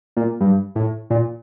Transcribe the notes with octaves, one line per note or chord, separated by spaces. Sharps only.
A#2
G2
A2
A#2